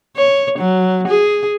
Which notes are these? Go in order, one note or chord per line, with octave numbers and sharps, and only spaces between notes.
C#5
F#3
G#4